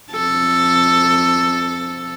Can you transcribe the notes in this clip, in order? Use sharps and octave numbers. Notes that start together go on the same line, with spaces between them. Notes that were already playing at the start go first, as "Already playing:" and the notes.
F2 A4